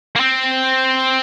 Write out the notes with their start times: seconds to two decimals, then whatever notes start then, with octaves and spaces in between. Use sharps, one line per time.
0.16 A#3
0.20 C4